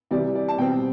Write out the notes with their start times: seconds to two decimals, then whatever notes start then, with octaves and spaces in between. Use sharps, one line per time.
0.11 C3 E3 G3 D5
0.35 D5
0.48 A5
0.58 B2 G3 C4 G5